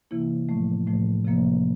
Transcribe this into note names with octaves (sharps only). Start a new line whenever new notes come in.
C3 E3 A#3 E4
A2 F3 A3
A2 F3 A3
C3 F3 A#3